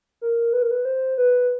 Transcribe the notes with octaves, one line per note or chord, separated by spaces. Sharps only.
A#4
B4
A#4
B4
C5
B4